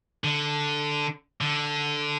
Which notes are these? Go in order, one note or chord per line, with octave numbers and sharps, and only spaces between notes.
D3
D3